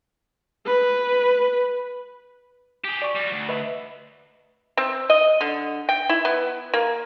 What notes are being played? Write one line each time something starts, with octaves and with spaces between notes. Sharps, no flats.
B4
G4 G#4
D5 C#6
G3 F#4
D2
B4 D#5 E5
C4
D#5
D3
G5
E4
B3
A#3